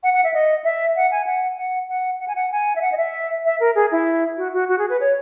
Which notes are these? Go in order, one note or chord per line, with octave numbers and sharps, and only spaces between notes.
F#5
F#5
E5
D#5
E5
F#5
G#5
F#5
F#5
F#5
F#5
G#5
F#5
G#5
E5
F#5
D#5
E5
E5
A#4
G#4
E4
F#4
F#4
F#4
G#4
B4
C#5